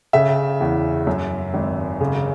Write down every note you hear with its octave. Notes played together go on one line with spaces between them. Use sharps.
C#3 E5
E2
F#2
G#1
C#3